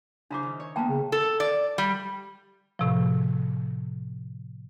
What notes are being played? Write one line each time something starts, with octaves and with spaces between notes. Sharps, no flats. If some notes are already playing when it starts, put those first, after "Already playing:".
C#3 D4 E4 C5 A#5 D6
D#3
C#5
A#3 B3 G5 A5 A#5
C#3
A4
D5
G3
A2 C3 F3